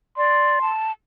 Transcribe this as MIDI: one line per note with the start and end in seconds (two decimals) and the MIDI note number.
0.17 0.59 74
0.17 0.72 84
0.61 0.92 81